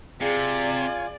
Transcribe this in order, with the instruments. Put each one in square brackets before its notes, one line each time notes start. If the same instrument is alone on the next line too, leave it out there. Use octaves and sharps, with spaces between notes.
[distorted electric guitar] C3 [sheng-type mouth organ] F4 G#5 [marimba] G#4 [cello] D5